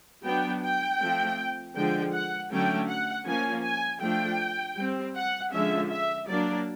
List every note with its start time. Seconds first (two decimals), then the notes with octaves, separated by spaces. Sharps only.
0.24 F#3 B3 D4 G5
0.63 G5
1.01 F3 A3 C4
1.76 D3 F3 G#3 G5
2.14 F#5
2.52 D3 F#3 A3 C#4 G5
2.88 F#5
3.26 F3 A#3 C#4 G#5
3.64 G#5
4.02 F3 A3 D4 G5
4.77 G3 C4
5.16 F#5
5.53 D3 F3 G#3 C#4 E5
5.91 E5
6.28 F#3 A#3 D4 D5